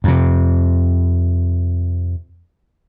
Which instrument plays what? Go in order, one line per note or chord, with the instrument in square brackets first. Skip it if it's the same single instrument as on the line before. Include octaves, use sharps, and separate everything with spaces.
[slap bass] F2 C3